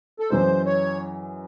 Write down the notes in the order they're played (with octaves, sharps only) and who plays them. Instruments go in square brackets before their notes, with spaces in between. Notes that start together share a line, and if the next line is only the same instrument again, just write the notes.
[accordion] A4
[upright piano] F#2 E3 G#3 [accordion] C5
[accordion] C#5